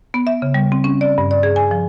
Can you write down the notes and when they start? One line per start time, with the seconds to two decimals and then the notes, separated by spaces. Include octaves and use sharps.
0.14 B3
0.27 E5
0.42 C#3
0.54 G3
0.72 C4
0.84 C#4
1.01 D5
1.18 G2
1.31 D5
1.43 G#4
1.56 G#5
1.71 F3